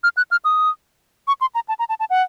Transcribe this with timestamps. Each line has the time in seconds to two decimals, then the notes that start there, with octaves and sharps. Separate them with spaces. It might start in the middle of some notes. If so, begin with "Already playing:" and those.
0.04 F6
0.17 F#6
0.31 F6
0.45 D#6
1.28 C#6
1.41 C6
1.55 A#5
1.69 A5
1.79 A#5
1.89 A5
2.00 A5
2.10 F#5